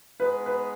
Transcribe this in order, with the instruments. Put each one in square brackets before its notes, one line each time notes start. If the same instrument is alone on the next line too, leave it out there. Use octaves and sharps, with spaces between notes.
[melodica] G#3 B3 D#4 G#4 [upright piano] B4
[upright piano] B4